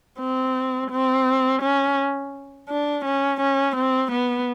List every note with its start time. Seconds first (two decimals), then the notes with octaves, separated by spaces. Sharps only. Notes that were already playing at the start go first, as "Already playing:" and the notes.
0.20 C4
0.91 C4
1.62 C#4
2.69 D4
3.05 C#4
3.41 C#4
3.76 C4
4.12 B3